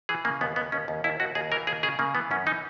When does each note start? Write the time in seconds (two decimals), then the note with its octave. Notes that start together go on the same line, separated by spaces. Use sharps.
0.09 E3 G#4
0.25 C#3 A#3
0.41 D#2 B3
0.56 D#2 B3
0.72 D#2 C#4
0.88 D#2
1.04 D#2 E4
1.20 D#2 F#4
1.35 D#2 G#4
1.52 E3 A#4
1.67 D#2 G#4
1.83 C#3 G#4
1.99 C#3 A#3
2.15 E3 B3
2.31 F#2 C#4
2.46 E3 D#4